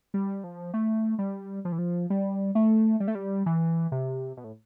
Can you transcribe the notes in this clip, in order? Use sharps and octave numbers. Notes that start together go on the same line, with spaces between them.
G3
F3
A3
G3
F3
E3
F3
G3
A3
G3
A3
G3
E3
C3
B2
A2